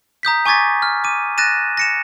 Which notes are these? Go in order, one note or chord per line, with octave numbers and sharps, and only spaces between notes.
A#5 D#6 G6 B6
G#5 C#6 D6 G#6 A6 B6
F6
D6 D#7
F#6 A6 A#6 D#7 E7
A#6 C#7 E7